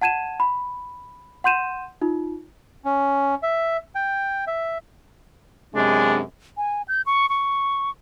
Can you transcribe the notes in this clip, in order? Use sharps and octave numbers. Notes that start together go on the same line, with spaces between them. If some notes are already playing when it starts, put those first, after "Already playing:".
F#5 A5 G#6 D#7 E7
B5
F#5 C6 G6 D#7 E7
D#4 F4
C#4
E5
G5
E5
F#2 C3 G#3 D4
G#5
G6
C#6
C#6